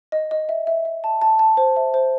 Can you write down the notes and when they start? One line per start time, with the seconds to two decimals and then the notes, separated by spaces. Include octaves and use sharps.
0.12 D#5
0.31 D#5
0.49 E5
0.67 E5
0.85 E5
1.04 A5
1.22 A5
1.39 A5
1.57 C5
1.76 E5
1.94 C5